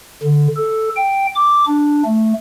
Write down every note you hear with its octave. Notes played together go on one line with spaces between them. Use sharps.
D3
A4
G5
D6
D4
A3